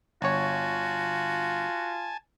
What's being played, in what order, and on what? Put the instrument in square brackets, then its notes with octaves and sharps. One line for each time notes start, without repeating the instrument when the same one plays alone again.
[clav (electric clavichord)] G1 C#5 [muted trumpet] F4 [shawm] F#4 [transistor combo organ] G#5 A5